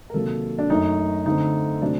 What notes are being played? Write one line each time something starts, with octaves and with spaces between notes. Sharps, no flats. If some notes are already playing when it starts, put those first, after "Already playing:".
A#4
C3 D#3 F#3 A#3 A4
D4
F#2 F#3 A3 D#4
D3 A3 C4 D#4
C3 F#3 A3 C4 D4